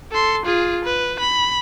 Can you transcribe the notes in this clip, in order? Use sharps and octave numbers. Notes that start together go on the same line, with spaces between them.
A4 C6
F4 G#4
B4
B5